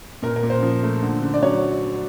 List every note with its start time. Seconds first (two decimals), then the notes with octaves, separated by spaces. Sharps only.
0.22 A#2 A#4
0.36 A#4
0.43 A#2
0.50 C5
0.62 F3
0.83 A3
1.03 D3
1.22 D3
1.34 D5
1.43 F#3 C#5